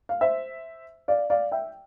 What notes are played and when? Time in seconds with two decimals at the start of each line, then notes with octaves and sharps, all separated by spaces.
0.09 F5
0.21 C5 E5
1.08 D5 F5
1.30 D5 F5
1.52 E5 G5